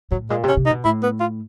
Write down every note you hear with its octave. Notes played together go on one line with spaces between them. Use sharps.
A2 F#3
A#2 G#3
C3
C#4
C3
D#4
B2
A2 E4
B3
F4